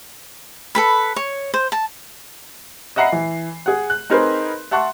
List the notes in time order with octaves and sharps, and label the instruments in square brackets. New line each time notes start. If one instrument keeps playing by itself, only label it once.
[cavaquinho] A4 B4 B5
C#5
C5
A5
[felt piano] D#5 E5 F#5 A#5 B5 C7
E3
G#4 F#5
F#6
C4 D#4 G#4 A#4 B4 C6
E5 F#5 A5 C6 C#6 F#6